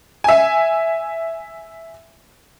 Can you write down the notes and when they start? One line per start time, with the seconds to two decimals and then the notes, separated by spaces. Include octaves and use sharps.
0.24 E5 G#5